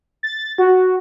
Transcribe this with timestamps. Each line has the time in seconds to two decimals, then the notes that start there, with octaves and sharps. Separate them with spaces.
0.23 A6
0.58 F#4